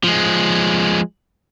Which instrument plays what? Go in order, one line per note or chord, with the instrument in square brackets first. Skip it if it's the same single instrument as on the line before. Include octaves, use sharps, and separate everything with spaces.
[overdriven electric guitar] F3 G#3